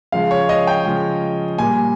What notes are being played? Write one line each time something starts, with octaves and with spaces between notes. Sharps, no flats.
C#3 F3 G#3 F5
C#5
D#5
G5
C#3 F3 G#3
A#2 G3 G#5